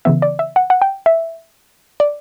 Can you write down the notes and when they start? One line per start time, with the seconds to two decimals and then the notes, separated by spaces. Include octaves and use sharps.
0.05 C#3 E3 B3 E5
0.22 D5
0.39 E5
0.56 F#5
0.70 F#5
0.82 G5
1.06 E5
2.00 D5